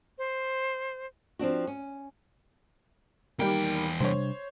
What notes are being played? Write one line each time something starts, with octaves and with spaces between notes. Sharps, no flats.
C5
F3 C4 D4 F#4
C#4
E2 D#3 G3 A#3 G5
C3 G3 D4 C5 C#5